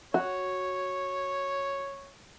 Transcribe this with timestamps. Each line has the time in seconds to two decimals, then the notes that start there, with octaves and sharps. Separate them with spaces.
0.14 F#4 C#5